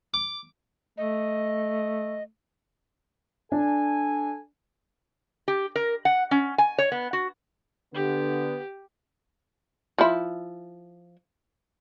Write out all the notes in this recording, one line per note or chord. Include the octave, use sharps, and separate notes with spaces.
D6
A3 D#5
D4 A4 G#5
G4
A#4
F#5
C#4
G#5
C#5
B3
F#4
D3 B3 G4
F3 E4